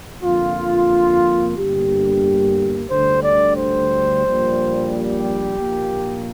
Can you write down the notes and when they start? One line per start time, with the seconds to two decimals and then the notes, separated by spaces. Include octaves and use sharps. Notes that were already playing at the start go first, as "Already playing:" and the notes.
0.22 F2 D3 A#3 F4
1.56 G1 G2 D3 G3 A#3 G4
2.90 D2 D3 G3 C5
3.23 D5
3.56 C5
4.23 A#1 A#2 G3
4.91 G4
5.57 A#1 A#2 A#3